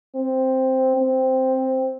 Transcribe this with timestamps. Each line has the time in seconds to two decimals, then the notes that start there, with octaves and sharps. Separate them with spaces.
0.15 C4
0.97 C4